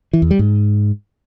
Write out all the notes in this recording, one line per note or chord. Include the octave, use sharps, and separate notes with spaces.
E3
E2
G3
G#2